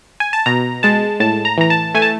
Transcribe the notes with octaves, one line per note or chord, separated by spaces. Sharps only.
G#5
A5
B2 A#5
G#3 A5
A2 A5
A#5
E3 A#5
A5
A3 G#5
A5